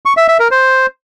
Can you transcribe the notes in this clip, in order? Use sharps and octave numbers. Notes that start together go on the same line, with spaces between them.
C#6
E5
E5
A#4
C5